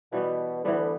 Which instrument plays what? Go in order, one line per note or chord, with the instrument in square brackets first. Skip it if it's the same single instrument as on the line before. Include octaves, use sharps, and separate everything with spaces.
[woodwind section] B2 [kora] E3 G3 B3
[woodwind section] D2 D3 [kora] E3 G3 B3